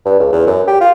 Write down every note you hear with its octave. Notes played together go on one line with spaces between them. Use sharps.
G2
C#2
E2
F#2
G4
F4